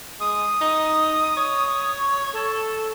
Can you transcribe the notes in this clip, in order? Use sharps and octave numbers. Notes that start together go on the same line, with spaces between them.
G#3 D#6
D#4
C#5
A4